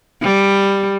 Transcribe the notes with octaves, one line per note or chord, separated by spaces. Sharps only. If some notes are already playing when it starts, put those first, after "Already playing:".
G3